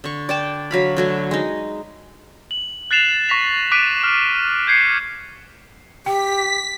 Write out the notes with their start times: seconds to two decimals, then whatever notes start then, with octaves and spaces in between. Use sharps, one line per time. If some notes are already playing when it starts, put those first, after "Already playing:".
0.04 D3 C#6
0.29 D5 G5 A5
0.71 D3 F#3 F5 B5
0.97 D3 F#3 A3
1.31 G#3 D#4
2.51 F#7
2.91 F#6 A6 C7 E7 F7
3.29 C#6 A#6 B6 F7
3.72 D6 F#6 B6 D7 D#7
4.04 F6
4.67 G6 G#6 C7 C#7
6.06 G4 G5 B6